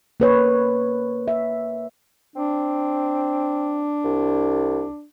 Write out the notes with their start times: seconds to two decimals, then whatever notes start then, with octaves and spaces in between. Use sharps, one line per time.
0.20 A#3 B4 C#5
1.28 E5
2.36 C4 D4
4.04 C2